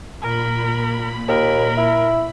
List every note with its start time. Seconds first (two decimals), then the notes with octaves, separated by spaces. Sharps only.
0.22 A#2 A#4 B5
1.28 D#2 A#4
1.77 E4